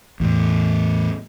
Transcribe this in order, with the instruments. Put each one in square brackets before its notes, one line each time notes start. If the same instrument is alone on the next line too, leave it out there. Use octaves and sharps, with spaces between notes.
[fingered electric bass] E2 A2